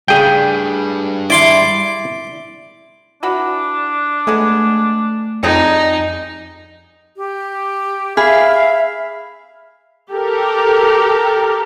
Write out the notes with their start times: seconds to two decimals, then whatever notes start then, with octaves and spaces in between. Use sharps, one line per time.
0.08 A2 C#3 G3 D4 G#4 G5
1.30 E4 D5 C6 D6
3.23 E3 D4 F#4 B5
4.27 G#3 A3 B3 G#4
5.43 F2 D3 G3 D#4 G#4
7.17 G4
8.17 G#4 E5 F5 B5 F6 B6
10.11 G4 A4 A#4